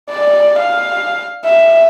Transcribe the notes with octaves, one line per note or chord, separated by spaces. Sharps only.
D5
F5
E5